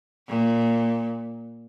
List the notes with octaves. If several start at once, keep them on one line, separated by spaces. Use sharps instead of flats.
A#2